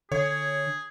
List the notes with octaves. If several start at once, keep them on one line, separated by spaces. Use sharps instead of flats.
D3 G#4 C#5